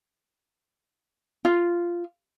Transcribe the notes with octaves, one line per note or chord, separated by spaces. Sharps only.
F4